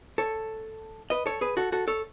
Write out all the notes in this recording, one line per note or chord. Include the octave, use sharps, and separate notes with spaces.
A4 C#5
B4 D#5
A4 C#5
G#4 B4
F#4 A4
F#4 A4
A4 C#5